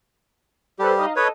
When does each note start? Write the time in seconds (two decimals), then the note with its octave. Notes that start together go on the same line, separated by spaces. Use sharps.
0.79 G3 G4 A4 B4 C5
0.97 D#4 D#5 F5
1.16 A4 B4 C#5 D#5